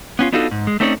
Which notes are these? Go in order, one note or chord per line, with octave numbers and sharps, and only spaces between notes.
B3 C#4 F4
B3 D4 D#4 F4 F#4 A4
G#2
G#3
A3 C4 C#4 D#4 A4 D5